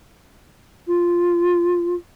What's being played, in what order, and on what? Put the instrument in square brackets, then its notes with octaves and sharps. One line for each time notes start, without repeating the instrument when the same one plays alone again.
[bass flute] F4